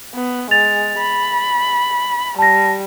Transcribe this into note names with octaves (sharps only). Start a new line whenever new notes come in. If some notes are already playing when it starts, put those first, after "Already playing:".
B3
G#3 A6 F7
B5
G3 A5 A#6